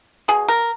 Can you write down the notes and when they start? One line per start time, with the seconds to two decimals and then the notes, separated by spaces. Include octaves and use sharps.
0.28 B2 G#4
0.49 A#4